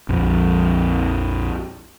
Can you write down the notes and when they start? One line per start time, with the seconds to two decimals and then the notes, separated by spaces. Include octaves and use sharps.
0.09 A#1 F2